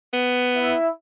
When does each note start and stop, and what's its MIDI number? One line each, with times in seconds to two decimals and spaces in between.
0.13 0.74 59
0.56 0.88 64
0.56 0.88 76